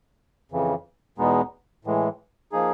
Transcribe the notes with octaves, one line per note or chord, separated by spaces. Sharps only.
F2 C#3 E3
E2 B2 G#3 B3 D#4
A2 E3 G#3
F3 A#3 D#4 G#4